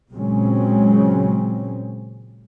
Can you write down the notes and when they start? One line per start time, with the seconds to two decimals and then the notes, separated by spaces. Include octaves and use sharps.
0.12 A#2 C#3 F#3 G#3 C4 C#4